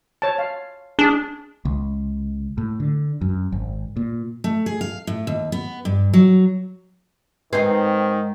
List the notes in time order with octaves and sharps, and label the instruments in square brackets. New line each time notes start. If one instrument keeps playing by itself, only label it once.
[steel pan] C#5 A5
F5
[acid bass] D4 [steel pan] G#4
[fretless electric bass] C#2
A2
D3
F#2
G#1
A#2
[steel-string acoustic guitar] A3
G#4
F5
A2
D#2
B3
G2
F#3
[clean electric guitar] G#2 [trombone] D#3 [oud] C4 D#4 [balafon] B4